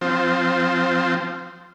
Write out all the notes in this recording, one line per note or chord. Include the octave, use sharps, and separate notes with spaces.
F3 C4